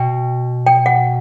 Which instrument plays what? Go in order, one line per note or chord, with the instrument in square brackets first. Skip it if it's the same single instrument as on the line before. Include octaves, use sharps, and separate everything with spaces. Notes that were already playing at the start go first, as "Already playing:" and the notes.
Already playing: [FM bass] B2 [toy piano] G5
[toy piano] G5
F#5